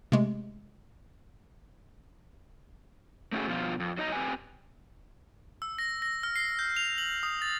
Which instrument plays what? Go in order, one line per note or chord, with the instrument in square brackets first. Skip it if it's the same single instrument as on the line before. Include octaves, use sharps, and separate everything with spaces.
[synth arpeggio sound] C3 G#3 A3
[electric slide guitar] A3 C#4 E4 F#4 G#4
B2 F3 F4
F2
F#3 D#4 D#5 A#5
C4 G4 B4 G#5
[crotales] E6
A#6
A#6
F6
C7
G6
F7
F#7
D#6
A6